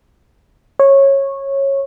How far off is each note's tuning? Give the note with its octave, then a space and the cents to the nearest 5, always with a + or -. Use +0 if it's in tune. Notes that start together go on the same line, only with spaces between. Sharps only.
C#5 -15